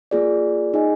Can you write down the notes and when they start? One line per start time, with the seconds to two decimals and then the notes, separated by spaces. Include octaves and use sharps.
0.11 A#3 F4 G#4 D5
0.74 D#4 G#4 D#5 G#5